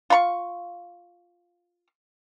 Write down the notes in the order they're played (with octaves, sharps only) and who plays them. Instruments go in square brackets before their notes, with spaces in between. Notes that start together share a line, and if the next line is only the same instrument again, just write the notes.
[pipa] F4 F5 B5 C#6